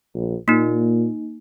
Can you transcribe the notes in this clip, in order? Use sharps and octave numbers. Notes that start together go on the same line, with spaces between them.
A#1
A#2 A#3 D#4